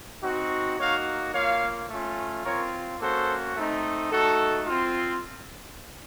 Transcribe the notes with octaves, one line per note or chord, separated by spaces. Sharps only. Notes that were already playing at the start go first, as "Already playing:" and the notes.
C4 D#4 F#4
A#3 D#4 F#4 C#5 F5
A#3 F4 C#5 F5
A3 C#4 F4
C4 F4 A#4 C#5
A#3 C#4 F#4 A4 C5
A3 C4 D#4
A3 D#4 F#4 A4
C4 F4